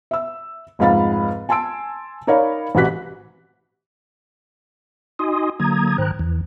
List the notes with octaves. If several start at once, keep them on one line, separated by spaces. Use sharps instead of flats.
E5 E6
F1 G#2 F4 F5 B5 A6
G#5 A5 C6 E6 D7
D#4 A#4 C#5 D5 F5 B5
A1 C3 E3 F#4 F#6 B6
D#4 F#4 D#5 G#5 C6 D#6
D3 F#3 A#3 A#5 D#6 G#6
G#2 D#3 C5 G5 A#5 F#6
E2 E3